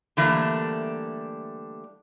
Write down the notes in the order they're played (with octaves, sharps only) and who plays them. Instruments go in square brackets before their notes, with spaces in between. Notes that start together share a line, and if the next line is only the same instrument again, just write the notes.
[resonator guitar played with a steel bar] D3 E3 G3 A3 A#3 D4